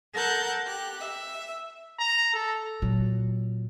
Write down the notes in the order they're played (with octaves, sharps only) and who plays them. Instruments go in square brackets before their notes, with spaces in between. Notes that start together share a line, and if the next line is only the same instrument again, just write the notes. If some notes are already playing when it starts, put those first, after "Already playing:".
[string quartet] A4 A#4 F#5 A5 F#6 G6
G4 F#6
E5
[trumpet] A#5
A4
[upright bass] A#2 F#3